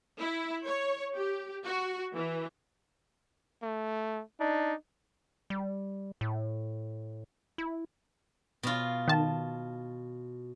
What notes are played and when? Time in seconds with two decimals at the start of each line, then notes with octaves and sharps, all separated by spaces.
0.19 E4
0.65 C#5
1.16 G4
1.64 F#4
2.13 E3
3.63 A3
4.40 D4 D#4
5.50 G3
6.21 A2
7.58 E4
8.63 B2 F4
9.08 D#3 A5